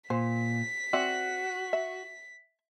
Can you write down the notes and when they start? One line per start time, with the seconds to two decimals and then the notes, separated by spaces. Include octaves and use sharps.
0.10 A#2 C5 B6
0.93 C4 F#4 D5 E5
1.73 E5